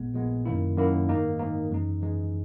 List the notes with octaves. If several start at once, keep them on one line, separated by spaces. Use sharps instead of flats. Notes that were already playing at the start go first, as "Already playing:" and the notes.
Already playing: A#1 A#2 G#3 B3
A#1 A#2 G#3 B3
F#2 D#3 A#3 E4
F#2 D#3 A#3 E4
G#2 D#3 A#3 D#4
G#2 D#3 A#3 D#4
F#2 E3 G#3 D#4
F#2 E3 G#3 D#4